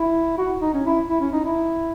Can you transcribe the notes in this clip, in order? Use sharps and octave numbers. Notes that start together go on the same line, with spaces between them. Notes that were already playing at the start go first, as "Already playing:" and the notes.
Already playing: E4
F#4
D#4
C#4
E4
E4
C#4
D#4
E4